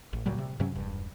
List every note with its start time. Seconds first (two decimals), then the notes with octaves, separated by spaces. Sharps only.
0.13 A1
0.26 D2 A#2 F#3 G3
0.38 C3
0.60 G2 C3 F#3 C#4
0.75 E1 G2